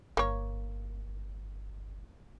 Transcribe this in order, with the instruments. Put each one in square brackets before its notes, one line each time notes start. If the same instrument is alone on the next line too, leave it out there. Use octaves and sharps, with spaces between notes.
[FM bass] G1 [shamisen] A#3 C#5